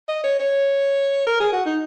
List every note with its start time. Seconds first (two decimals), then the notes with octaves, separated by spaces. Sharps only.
0.08 D#5
0.24 C#5
0.39 C#5
1.27 A#4
1.40 G#4
1.53 F#4
1.66 D#4